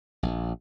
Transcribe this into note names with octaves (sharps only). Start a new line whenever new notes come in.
A#1